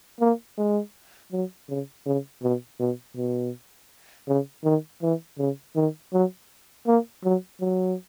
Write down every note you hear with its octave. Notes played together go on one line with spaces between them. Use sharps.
A#3
G#3
F#3
C#3
C#3
B2
B2
B2
C#3
D#3
E3
C#3
D#3
F#3
A#3
F#3
F#3